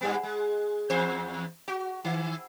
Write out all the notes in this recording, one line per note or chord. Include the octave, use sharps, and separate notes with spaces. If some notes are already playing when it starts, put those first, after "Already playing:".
G2 G3 B3
G#3
E2 C5
F#4
D#3